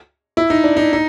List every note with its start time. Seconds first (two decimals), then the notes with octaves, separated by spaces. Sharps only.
0.37 E4
0.50 D#4
0.64 D4
0.77 D#4
0.93 D#4